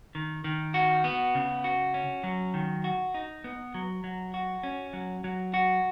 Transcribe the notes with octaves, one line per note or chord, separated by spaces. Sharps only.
D#3
D#3
F#4
B3
C#3
F#4
C#4
F#3
D#3
F#4
D#4
B3
F#3
F#3
F#4
C#4
F#3
F#3
F#4